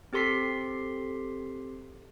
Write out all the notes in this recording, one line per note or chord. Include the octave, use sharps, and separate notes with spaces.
C4 G4 A4 C6 B6 C7